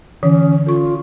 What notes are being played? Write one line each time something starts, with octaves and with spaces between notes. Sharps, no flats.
D3 E3 C#4
F4 A4 C#6